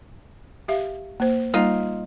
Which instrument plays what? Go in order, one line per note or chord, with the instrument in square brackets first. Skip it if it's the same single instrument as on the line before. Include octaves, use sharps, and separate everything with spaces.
[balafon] G4 E5 F5
A#3 C5
[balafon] G3 A#3 [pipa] D#4 F4